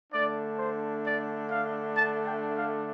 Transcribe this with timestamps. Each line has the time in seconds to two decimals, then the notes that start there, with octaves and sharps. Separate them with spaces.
0.12 D3 A3 D4 D5
0.58 C5
1.05 D5
1.50 F5
1.95 A5
2.26 G5
2.57 F5